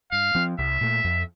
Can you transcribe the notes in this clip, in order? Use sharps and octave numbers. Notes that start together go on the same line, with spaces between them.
G2 F5
F3 C4
C2 E5
A#2 A3
F2